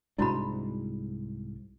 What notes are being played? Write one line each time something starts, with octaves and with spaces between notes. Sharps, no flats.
C2 G#2 D4 E4 F#4 B5